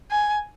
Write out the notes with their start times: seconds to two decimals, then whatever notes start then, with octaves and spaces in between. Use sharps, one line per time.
0.11 G#5